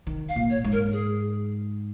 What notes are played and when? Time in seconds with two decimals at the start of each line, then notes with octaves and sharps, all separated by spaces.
0.07 D#3
0.29 F5
0.36 A#2
0.50 C#5
0.64 G#2
0.72 A#4
0.92 G#4